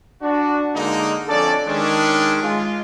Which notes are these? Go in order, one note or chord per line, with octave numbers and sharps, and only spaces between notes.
D4 F#4
D3 G#3 A#3 D#4
F2 C#4 D4 A4 D5
D#3 G#3 C#4 D4
G#3 F4